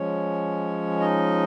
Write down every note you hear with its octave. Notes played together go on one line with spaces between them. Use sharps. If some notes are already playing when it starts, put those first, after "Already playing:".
Already playing: F3 G#3 C#4 C#5
D#4 D#5